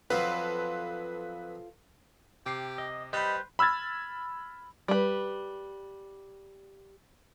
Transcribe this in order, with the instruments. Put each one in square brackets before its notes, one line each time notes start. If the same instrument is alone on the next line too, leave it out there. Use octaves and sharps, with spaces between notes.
[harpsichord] F2 F#3 [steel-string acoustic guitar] F4 A4 C5 [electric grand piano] B4
[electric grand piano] C3 D6 C7 [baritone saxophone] G4
[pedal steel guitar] D#5
[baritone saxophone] G3 [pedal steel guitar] B4 C5 [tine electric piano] D#5 B5
[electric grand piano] B5 E6 F6 G#6 A6
[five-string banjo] G3 B4